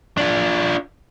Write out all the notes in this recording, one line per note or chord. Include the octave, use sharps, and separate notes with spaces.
D4 F4